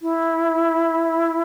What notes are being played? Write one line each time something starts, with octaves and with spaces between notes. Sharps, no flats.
E4